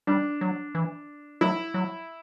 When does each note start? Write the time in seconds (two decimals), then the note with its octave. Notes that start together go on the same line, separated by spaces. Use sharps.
0.07 G3 D4
0.41 F#3
0.75 E3
1.41 F#3 E4
1.74 F#3